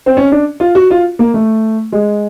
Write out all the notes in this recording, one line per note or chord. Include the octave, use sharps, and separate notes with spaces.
C4
C#4
D4
F4
F#4
F4
A#3
A3
G#3